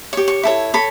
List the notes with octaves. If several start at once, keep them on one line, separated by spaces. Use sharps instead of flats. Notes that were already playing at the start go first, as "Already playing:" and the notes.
G4 C#5 C#6
C#6
E4 A4 C#5
A4 C#5 B5